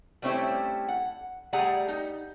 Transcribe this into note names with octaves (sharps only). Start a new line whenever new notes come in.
G3 A3 C4 C#4 E4 G4
F#5
G3 A3 G#4 F#5 G#5 A#5
D#4